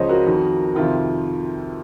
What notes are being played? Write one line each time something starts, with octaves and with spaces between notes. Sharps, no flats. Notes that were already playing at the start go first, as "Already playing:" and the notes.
Already playing: C#2 C#3 F3 C5 C#5 D#5
F#4 A#4
F2 D#3
F2 C3 D#3 F4